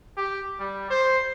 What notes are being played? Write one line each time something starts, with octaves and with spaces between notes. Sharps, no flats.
G4
G3
C5